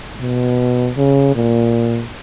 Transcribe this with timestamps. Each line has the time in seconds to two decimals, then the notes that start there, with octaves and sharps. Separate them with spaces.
0.21 B2
0.97 C#3
1.35 A#2